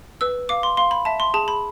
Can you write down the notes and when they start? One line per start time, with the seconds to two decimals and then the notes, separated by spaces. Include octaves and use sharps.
0.21 B4 E6
0.49 F5 D6
0.63 C6
0.77 F5 C6
0.91 B5
1.05 E5 A5
1.20 C6
1.34 G#4 A5
1.48 B5